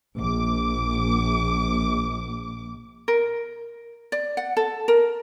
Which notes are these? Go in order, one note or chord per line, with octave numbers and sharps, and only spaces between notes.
A#1 D6
A#4
D5
F#5
A4
A#4